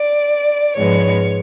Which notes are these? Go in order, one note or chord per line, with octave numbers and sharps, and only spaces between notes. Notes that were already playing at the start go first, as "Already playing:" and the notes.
Already playing: D5
G#2 F3 G#3 B3 C#5